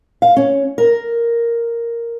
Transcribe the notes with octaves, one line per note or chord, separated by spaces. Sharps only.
F5
C#4
A#4